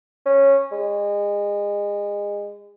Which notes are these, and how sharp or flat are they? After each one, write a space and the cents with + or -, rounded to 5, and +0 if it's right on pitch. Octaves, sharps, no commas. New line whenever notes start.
C#4 -10
G#3 -30